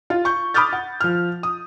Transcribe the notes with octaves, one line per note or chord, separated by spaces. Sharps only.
F4
C#6 G6
B5 D6 D#6 F6 G6 A6
F#5
F3 F6
D#6